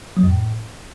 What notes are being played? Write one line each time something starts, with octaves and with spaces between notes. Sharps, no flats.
F#3
F2
A2